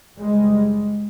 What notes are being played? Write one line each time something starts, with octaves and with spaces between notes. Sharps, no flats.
F#1 G3 G#3